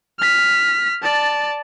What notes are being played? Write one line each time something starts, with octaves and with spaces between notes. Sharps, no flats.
F6 B6
D5 A5